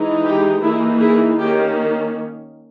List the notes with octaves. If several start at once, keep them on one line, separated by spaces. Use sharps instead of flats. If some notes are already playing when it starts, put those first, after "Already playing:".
Already playing: E3 G#3 D#4
G4
E3 A#3 D#4 E4 G#4
E4 G#4
D#3 A#3 C#4 G4